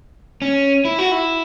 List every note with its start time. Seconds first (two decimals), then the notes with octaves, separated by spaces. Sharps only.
0.42 C#4
0.85 E4
0.99 F#4
1.12 E4